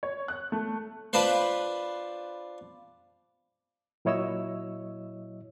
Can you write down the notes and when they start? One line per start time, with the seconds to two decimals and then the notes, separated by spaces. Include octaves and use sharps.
0.03 C#5
0.28 F#6
0.52 A3
1.13 D4 F4 B4 C5
4.05 A#2 F#3 E4 C#5 D#5 E6